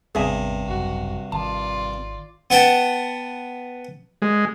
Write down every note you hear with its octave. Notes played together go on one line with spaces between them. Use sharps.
G#1 E2 G2 C3 B3 G#4 E5 G#5
G#1 C#2 F#2 F#4
G#1 D#3 F4 D5 A5
B3 F#5 G5 A5
G#3